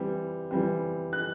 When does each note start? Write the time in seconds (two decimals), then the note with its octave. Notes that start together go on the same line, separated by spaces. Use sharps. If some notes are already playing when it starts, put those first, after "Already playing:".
Already playing: E3 G3 C4
0.51 E3 G3 C4
1.13 F#6